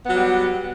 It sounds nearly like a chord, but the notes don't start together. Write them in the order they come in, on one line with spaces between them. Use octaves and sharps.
B3 F#3 G3